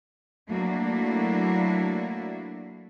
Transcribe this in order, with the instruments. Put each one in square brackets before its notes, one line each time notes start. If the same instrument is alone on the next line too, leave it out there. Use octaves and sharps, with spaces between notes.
[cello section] F#3 A3 A#3 D4 E4 F#4